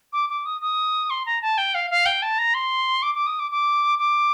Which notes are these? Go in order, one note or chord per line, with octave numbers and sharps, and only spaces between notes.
D6
D6
D#6
D#6
C6
A#5
A5
G5
F5
F5
G5
A5
A#5
C6
D6
D6
D#6
D6
D6
D6